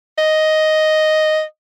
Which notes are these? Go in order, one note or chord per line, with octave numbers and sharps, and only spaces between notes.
D#5